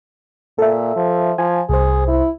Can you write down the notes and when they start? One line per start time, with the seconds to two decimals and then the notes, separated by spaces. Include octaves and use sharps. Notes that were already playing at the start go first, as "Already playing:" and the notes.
0.59 A#2 A4 E5
0.96 F3
1.38 F3 G#5
1.69 C2 G#4 C5
2.08 E4